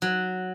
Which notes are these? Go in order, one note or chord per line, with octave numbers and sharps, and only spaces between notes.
F#3